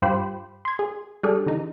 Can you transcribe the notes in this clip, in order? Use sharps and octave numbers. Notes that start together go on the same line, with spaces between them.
G2 F4 G4 C5 B5
C6 G#6
G#4
G3 D4 G#4 A4
D3 E3 D#4